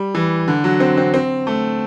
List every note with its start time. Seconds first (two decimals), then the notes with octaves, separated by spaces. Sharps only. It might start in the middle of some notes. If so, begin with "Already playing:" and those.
Already playing: G3
0.15 E3
0.48 D3
0.64 F#3
0.80 C4
0.97 C4
1.14 C4
1.47 A3